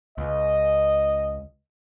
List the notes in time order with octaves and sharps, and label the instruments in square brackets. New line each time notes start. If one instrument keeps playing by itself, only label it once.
[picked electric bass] C#2 [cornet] D#5